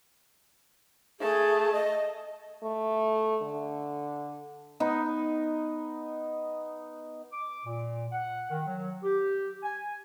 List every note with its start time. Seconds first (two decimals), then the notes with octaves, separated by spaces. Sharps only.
1.20 A3 G#4 A5
1.72 D#5
2.63 A3
3.42 D3
4.80 B3 D#4
7.32 D6
7.65 A#2
8.12 F#5
8.50 D#3
8.67 F#3
9.03 G4
9.63 G#5